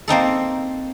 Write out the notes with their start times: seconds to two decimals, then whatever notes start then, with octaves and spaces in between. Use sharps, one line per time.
0.08 A#3 C4 D#4 A4